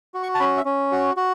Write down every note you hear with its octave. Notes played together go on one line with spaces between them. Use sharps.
F#4
C#6
A5
C#4 B5
E5
C#4
F#4
F#4